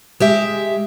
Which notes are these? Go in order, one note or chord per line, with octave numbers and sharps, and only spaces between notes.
G#3 G4 E5